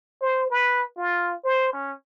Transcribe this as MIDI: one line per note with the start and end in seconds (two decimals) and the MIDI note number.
0.21 0.48 72
0.50 0.85 71
0.97 1.35 65
1.44 1.72 72
1.73 1.93 61